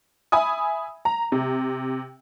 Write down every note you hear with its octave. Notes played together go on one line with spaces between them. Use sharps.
E5 G#5 B5 D#6
A#5
C3